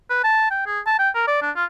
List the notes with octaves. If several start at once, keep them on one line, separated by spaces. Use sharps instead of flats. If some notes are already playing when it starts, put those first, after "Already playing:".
B4
A5
G5
G#4
A5
G5
A#4
D5
D4
F4